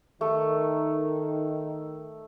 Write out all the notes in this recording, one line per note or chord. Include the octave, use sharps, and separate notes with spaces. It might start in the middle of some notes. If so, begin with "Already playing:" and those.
D#3 A3